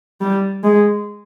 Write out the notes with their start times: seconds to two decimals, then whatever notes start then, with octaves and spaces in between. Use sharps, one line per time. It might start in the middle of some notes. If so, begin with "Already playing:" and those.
0.21 G3
0.64 G#3